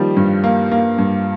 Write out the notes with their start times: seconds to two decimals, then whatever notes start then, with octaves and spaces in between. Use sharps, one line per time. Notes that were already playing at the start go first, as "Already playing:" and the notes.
Already playing: D#3 F3 G3 A#3
0.17 G2
0.44 A#3
0.72 A#3
0.99 G2